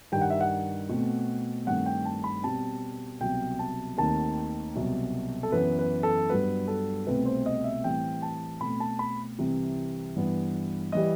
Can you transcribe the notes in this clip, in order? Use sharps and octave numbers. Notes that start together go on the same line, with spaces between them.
G2 D#3 G3 G5
F#5
E5
F#5
B2 A3 C4
G2 D#3 A3 C4 F#5
G5
A5
B5
B2 G3 C4 A5
C2 B2 F#3 G5
A5
D#2 D#3 A3 C4 A5
C2 B2 F#3
A4
F#2 E3 B3 B4
B4
A4
G2 F#3 B3 B4
A4
C2 B2 A3 C4 B4
C5
D#5
E5
A2 E3 G3 C4 G5
A5
B2 A3 C4 B5
A5
B5
C2 C3 E3
G2 E3 B3
E3 G3 D#5